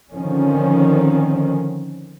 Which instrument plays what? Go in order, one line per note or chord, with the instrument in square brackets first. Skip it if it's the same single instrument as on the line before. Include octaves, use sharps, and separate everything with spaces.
[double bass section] D3 D#3 F3 C4 C#4